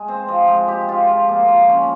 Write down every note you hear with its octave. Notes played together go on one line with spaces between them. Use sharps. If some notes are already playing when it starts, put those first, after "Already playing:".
Already playing: G#3 G#4
C4
F3
G#3
G4
F4
F3
A#3
F3
C#4